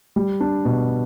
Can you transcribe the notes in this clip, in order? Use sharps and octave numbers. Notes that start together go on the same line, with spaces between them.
G3
D4
B2